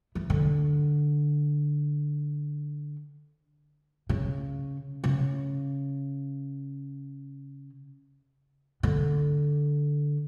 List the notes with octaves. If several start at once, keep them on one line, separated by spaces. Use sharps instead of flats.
E3
D3
C#3
C#3
D3